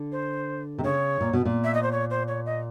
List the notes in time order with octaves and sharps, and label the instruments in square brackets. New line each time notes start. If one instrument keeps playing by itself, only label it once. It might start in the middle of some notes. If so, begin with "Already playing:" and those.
Already playing: [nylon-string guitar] D3
[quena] C5
[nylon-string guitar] C3
[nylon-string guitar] C#3 [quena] C#5
[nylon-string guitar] A#2
B2
A#2
[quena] E5
D#5
C5
C#5
C5
C#5
D#5